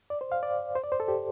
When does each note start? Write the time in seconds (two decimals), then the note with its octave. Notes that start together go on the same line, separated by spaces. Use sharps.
0.10 D5
0.21 C5
0.32 F5
0.43 D5
0.75 C5
0.84 D5
0.92 C5
1.00 A4
1.08 G4